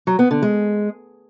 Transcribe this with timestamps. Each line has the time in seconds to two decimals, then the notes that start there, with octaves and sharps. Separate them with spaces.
0.07 F#3
0.19 B3
0.31 D3
0.42 G#3